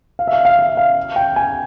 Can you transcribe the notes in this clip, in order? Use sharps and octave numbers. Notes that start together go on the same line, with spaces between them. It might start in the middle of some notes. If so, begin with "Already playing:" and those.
F5
E5
F5
F5
E5
F5
G5
G#5